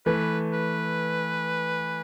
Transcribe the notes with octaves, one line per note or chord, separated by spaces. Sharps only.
E3 A3 B4
B4